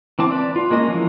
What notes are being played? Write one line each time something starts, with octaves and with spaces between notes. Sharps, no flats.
E3 C4 A5 D6
B4 D5
F4
G#3 A#3 C#4 D#5
E3 F3